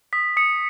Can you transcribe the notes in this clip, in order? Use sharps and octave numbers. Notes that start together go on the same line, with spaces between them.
D#6 B6
D#6 C#7